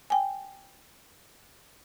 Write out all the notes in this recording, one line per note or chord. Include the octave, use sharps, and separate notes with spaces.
G5 G#5